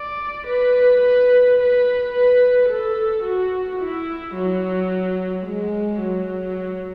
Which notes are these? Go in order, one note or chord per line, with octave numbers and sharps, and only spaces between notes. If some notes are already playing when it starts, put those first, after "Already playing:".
Already playing: D5
B4
B4
B4
B4
A4
F#4
E4
F#3
G#3
F#3